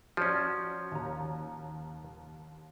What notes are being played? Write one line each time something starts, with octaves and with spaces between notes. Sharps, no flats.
F3 C#4 F#4 C#5 D5
D#2 A#5